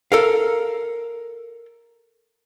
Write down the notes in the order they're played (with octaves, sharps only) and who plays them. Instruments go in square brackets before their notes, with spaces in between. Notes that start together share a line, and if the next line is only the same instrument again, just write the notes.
[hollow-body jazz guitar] A4 A#4 F5